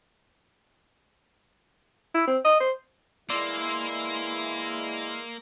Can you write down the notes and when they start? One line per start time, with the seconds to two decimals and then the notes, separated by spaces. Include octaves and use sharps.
2.14 E4
2.27 C4
2.45 D#5
2.60 C5
3.30 E3 G#3 A#3 E4 D5 C6 E6